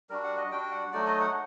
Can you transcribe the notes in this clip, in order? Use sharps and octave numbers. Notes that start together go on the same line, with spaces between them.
G3 D4 F#4 A#4
F#5
D#5
G3 D4 F#4 G5
F#5
F#3 A3 D#4 F#4 D5
D#5
F#5